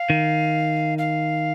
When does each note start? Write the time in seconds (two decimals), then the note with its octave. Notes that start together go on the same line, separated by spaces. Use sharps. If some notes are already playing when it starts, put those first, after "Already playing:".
Already playing: F5
0.10 D#3
0.98 F5